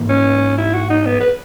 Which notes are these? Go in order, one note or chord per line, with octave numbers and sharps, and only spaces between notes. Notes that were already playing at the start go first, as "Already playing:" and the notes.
Already playing: G#2 E3 A#3
C#4
E4
F#4
D#4
B3
B4